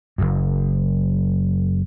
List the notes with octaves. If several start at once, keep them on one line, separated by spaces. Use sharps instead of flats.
F#1 F#2